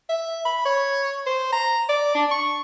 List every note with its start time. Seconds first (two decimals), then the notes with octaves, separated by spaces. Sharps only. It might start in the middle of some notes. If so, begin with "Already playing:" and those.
0.09 E5
0.45 B5
0.66 C#5
1.26 C5
1.52 A#5
1.89 D5
2.15 D4
2.31 C#6